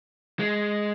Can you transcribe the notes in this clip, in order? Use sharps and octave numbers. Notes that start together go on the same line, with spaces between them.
G#3